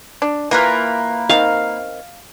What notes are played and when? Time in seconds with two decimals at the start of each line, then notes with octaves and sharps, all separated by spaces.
0.22 D4
0.51 E3 A#3 F4 A#4 B4
1.29 D#3 C4 F5